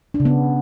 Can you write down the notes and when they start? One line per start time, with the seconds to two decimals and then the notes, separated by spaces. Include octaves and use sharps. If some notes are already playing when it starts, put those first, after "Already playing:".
0.14 D4
0.20 C#3
0.25 B3